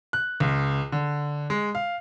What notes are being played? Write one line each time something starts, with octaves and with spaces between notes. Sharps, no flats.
F#6
C#2
D3
G#3
F5